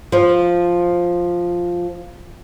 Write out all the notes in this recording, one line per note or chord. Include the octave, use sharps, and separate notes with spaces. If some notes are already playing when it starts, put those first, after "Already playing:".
F3 C5